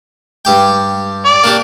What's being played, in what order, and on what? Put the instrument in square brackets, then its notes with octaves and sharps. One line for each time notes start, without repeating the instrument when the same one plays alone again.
[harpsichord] G2 G4 G5
[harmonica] D5
[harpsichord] A#3 D4 G4